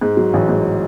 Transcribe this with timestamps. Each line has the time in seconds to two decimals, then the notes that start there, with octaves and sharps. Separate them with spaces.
0.01 G#2
0.17 F#3
0.33 A1
0.49 G#2